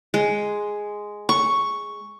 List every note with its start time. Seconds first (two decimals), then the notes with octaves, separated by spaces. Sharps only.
0.14 G#3
1.29 C#6